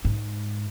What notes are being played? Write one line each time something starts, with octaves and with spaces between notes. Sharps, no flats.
G#2